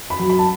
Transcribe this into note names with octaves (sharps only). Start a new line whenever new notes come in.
B5
F#3
B5
A5